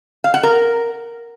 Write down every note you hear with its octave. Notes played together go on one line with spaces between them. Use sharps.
F5
F#5
A#4